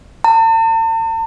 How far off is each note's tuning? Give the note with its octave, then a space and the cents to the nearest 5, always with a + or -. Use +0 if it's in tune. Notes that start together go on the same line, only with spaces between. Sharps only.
A5 +45